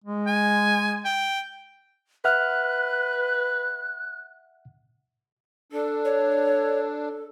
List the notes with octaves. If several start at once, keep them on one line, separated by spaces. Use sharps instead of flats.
G#3
G#5
G5
B4 E5 F#5 F6 F#6
D4 A4
C#5